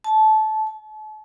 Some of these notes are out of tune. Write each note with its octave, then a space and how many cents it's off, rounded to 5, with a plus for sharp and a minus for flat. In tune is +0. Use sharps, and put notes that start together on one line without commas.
A5 -20
A5 -40